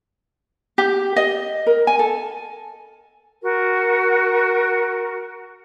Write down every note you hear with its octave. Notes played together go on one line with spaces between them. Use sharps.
G4
D#5
A#4
G#5
A4
F#4 A#4